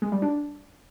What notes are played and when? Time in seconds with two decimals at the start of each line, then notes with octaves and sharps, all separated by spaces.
0.02 G#3
0.12 G3
0.22 D4